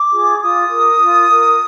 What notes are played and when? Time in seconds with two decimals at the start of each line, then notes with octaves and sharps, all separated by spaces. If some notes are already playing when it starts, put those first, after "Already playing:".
Already playing: D6
0.11 F4 G#4
0.41 F4 D#6
0.70 A#4
1.01 F4
1.30 A#4